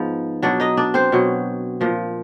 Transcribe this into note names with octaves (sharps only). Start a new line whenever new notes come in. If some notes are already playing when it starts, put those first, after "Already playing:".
Already playing: G#2 F3 B3
B2 F#3 D4 D5
D#4 D#5
D4 D5
C4 C5
B2 F#3
A#2 F3